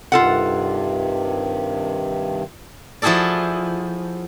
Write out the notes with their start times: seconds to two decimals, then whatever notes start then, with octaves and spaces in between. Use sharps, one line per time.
0.12 G2 C3 D#3 F4 A4 F#5
3.02 F3 E4 F#4 G#4 A4 D5